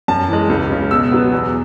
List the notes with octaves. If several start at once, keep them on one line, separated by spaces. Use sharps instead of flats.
F#2 A5
E3 G#3
C#2
C#3 F#3
B2 E6
F#3 B3
E2